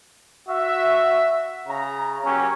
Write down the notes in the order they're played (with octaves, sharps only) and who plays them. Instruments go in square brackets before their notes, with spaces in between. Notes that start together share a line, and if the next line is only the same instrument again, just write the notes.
[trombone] F#4 [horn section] E5
[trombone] C#3 [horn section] A#5
[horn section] F#3 A#3 G4 [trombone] C#4